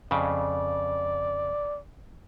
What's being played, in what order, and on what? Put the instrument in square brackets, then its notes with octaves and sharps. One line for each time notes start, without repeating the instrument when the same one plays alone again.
[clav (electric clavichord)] F2 C#3 [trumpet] D5